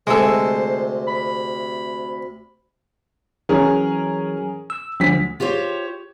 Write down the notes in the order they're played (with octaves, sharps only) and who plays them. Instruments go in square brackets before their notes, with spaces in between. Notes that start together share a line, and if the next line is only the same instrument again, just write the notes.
[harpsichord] D2 C3 [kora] G#3 A4 [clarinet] C5
[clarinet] B5
[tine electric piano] E3 F#3 [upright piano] C#4 G#4 A#4
[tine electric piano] E6
[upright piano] D2 B6 [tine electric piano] F3 F#3
[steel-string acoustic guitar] F4 G4 C5 C#5